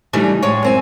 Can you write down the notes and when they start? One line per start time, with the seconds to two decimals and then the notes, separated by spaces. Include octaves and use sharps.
0.13 C#3 E3 G3 A3 D4 D#4
0.43 A2 G#3 C#5
0.63 F#2 C4 G#5